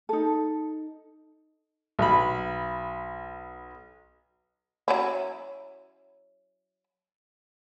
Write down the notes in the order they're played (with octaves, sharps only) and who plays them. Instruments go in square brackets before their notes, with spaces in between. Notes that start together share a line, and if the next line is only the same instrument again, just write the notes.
[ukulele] D#4 A4
[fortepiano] B1 B5
[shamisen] F#3 C#4 E4